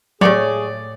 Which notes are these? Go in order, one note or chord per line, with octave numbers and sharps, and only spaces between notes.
A2 F#3 A3 G4 G#4 C#5 D5